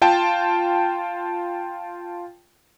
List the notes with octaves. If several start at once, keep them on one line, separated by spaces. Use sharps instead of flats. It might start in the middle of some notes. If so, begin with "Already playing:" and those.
F4 G5 A5